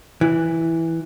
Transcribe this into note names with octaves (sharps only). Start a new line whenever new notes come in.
E3